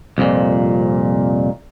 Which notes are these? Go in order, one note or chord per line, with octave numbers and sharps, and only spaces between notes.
C2 F2 A#2